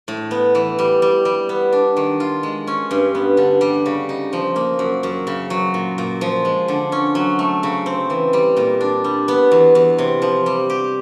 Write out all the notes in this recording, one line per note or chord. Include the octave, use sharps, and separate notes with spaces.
A2
B3
E3
G3
G3
G3
B3
D4
D#3
F4
G#3
C#4
G2
B3
D3
G3
C#3
D#4
F3
A#3
F#2
F#2
C#3
F#3
A#2
A#2
F3
G#3
D3
C#4
F#3
A3
C#3
C4
E3
G3
A#2
D4
G3
B3
E2
E2
C3
F3
G3
G4